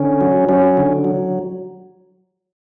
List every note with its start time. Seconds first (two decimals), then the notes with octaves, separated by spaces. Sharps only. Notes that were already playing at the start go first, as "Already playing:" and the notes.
Already playing: D3 C#4
0.21 F#3
0.49 F#3 C#4
0.77 D3
1.04 F#3